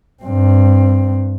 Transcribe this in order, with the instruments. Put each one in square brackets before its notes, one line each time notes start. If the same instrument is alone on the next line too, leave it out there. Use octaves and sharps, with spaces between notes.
[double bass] G2 C4